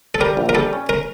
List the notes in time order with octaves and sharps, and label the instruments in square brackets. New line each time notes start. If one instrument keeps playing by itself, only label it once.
[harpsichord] A4
[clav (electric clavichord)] G3 [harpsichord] A#4
[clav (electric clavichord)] A#1
[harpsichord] A#4
[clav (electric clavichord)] G3 [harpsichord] A4
[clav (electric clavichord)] C#4
[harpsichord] A#4